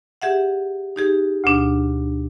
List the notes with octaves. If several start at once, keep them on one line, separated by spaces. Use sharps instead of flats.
G4 G#4 E5 F#5
D#4 G4 G#4
D2 B2 D4